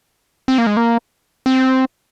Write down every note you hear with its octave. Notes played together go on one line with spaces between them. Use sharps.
C4
A#3
G#3
A#3
C4